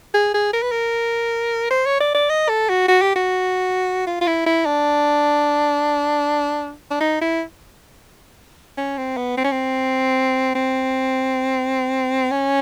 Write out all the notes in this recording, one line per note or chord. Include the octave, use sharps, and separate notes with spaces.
G#4
G#4
A#4
B4
A#4
C5
C#5
D5
D5
D#5
A4
F#4
F#4
G4
F#4
F4
F4
E4
E4
D4
D4
D#4
E4
C#4
C4
B3
C4
C#4
C4
C4
C#4